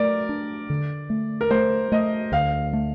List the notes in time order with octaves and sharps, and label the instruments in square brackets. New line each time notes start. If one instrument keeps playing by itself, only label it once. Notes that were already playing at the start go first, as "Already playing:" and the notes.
Already playing: [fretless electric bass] A3 [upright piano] A#4 D5
[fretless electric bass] D4
D3
A3
[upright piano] A#4
[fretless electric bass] A3 [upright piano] C5
[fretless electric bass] A3 [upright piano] D#5
[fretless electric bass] D2 [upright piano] F5
[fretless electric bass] A3